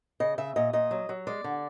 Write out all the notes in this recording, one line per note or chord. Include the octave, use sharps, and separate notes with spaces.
C#3 D#5
C#3 E5
A#2 D#5
A#2 D#5
F#3
F#3
G#3 D5
D3